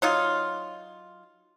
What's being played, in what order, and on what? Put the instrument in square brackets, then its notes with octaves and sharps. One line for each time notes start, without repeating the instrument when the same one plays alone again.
[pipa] F#3 D#4 F4